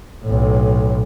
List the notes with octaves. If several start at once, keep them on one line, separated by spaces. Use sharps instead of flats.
B1 A2